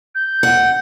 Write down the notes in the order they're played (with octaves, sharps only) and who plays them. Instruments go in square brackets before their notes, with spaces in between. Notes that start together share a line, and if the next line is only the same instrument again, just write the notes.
[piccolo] G6
[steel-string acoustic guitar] F#5